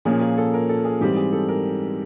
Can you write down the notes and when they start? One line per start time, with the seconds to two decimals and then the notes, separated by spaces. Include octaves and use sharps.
0.05 A#2 F3 A#3 C#4 G#4
0.21 G#4
0.38 A4
0.54 A#4
0.69 A4
0.85 G#4
1.01 G#2 E3 G3 C4 G4
1.16 G#4
1.33 A4
1.48 A#4